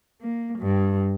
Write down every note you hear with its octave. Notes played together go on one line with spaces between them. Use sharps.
A#3
G2